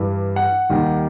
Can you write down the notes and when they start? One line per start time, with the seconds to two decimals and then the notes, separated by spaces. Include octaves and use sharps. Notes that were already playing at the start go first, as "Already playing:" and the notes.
Already playing: G2 E3 G3
0.36 F#5
0.70 D#2 D#3 G3